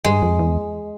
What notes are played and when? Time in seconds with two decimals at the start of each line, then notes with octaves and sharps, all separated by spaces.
0.04 G2 G#3
0.22 F2
0.39 E2